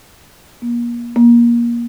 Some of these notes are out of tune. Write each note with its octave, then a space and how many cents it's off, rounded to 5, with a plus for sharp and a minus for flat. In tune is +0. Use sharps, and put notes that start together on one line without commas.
A#3 +35
A#3 +25